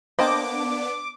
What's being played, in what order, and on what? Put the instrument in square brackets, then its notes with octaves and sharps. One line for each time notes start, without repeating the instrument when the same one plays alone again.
[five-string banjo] A#3 D#5 A5 [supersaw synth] B3 D4 [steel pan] C5 G5 [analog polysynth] D6